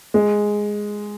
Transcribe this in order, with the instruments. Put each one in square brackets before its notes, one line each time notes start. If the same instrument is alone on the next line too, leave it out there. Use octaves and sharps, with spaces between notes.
[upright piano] G#3